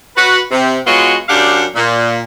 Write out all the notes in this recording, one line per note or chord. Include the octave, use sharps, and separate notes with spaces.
F#4 B4
C3
G#3 B3 F4 F#4 C#5 D#5
F#2 D4 G4 D5 F5 F#5
A#2